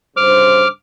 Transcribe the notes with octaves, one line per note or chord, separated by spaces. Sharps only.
G2 C#3 C5 D6 F6